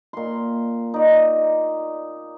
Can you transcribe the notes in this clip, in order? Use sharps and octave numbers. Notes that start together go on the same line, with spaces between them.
A#2 C6
D#4 D5